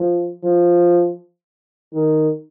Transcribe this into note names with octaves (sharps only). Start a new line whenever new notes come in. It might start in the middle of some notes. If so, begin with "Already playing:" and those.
Already playing: F3
F3
D#3